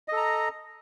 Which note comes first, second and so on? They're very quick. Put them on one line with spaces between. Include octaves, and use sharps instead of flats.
D#5 A4 A#5